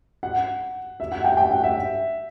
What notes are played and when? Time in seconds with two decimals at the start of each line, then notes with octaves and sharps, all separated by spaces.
0.23 F#5
1.00 E5
1.12 F#5
1.24 G5
1.37 G5
1.51 F#5
1.64 E5